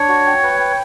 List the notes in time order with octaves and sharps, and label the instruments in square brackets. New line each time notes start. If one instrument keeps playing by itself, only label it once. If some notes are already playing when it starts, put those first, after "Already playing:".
Already playing: [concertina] D4 [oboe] C#5
[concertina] F#4
G5
B4
G5